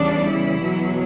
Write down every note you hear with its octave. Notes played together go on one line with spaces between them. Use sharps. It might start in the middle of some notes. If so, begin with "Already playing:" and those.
Already playing: E2 C#3 E3 G3 D4 D5
E3 E4
E2 B2 F#3